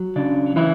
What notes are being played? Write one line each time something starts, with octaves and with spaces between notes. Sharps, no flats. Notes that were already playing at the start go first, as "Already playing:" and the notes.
Already playing: F#3
C#3 D4
E3 C#4 E4